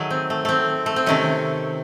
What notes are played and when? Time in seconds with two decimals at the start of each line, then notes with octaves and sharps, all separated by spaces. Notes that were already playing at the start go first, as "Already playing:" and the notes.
Already playing: D#3 F#3 A3 G#4
0.10 C4
0.30 A3
0.45 A3 C4
0.86 A3
0.96 C4
1.06 C3 D#3 A3 C#4